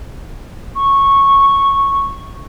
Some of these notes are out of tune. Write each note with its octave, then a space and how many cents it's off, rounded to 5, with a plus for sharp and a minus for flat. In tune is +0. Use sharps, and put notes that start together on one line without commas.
C#6 -10